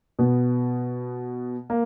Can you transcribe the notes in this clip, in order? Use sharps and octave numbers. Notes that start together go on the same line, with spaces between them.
B2 B3
A#3